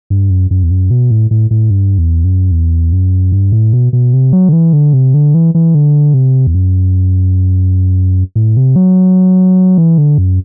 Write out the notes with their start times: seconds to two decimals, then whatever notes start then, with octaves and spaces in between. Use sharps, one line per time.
0.10 G2
0.30 F#2
0.51 F#2
0.63 E2
0.71 F#2
0.91 B2
1.11 A2
1.31 A2
1.51 A2
1.70 G2
1.98 E2
2.24 F#2
2.52 E2
2.93 F#2
3.32 G2
3.52 A2
3.73 B2
3.93 B2
4.13 C3
4.32 F#3
4.49 D3
4.53 E3
4.73 D3
4.93 C3
5.14 D3
5.34 E3
5.55 E3
5.75 D3
6.14 C3
6.47 E2
6.54 F#2
8.36 A2
8.57 C3
8.76 F#3
9.78 E3
9.98 D3
10.18 F#2